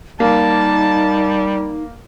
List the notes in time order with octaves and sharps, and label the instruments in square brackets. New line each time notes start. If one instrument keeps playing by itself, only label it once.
[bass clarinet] G3 [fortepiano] A#3 [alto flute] D#4 [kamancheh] A5